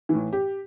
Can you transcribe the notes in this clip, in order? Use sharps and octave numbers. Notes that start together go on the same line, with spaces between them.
A2 E3
G4